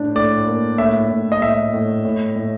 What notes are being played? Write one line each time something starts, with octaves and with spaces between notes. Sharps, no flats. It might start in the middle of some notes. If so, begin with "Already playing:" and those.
Already playing: A2 D4
A2 D5
A#3
A2 E5
A2
D#5
A2 E5
A2
A2
A2